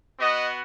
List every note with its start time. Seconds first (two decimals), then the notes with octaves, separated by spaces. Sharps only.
0.20 B3 F#4 D#5